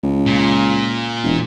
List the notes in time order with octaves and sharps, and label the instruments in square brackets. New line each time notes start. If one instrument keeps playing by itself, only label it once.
[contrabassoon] C#2
[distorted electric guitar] A#2
[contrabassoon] E1